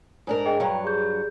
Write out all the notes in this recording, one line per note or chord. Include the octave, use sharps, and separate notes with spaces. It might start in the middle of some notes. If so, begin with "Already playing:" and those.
G#2 D4 A#4
G#4 D#5 G5
G2 F#3 F5 G5 A#5
G4 G#4 G6